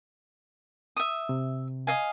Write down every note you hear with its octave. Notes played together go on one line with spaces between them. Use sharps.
E5 D#6
C3
D#5 F5 G#5